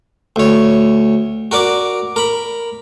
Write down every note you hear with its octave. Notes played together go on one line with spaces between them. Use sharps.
D2 C#5
F#4 A#4 D5 D6
A#4 B5